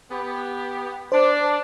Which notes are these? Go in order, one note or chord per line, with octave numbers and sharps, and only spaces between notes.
B3 G4
D4 C5